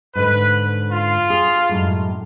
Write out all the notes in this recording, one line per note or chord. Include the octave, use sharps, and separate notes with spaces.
G#2 D3 B4
F4
G#4
F#2 A2 G#3